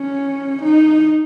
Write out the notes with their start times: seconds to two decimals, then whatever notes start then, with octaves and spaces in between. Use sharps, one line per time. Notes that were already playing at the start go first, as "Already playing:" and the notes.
Already playing: C#4
0.62 D#4